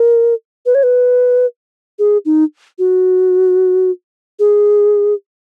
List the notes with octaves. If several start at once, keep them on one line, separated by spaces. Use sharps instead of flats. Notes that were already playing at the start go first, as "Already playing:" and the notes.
Already playing: A#4
B4
C#5
B4
G#4
D#4
F#4
G#4